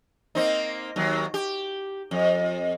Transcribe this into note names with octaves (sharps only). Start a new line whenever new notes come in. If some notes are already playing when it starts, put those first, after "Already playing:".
A#3 C4 D#4
D#2 F#3
G4
F2